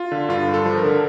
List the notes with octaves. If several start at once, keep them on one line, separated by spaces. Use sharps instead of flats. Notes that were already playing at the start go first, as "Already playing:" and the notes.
Already playing: F4
D3
G2 F4
G2
A4
F3
A#4
D3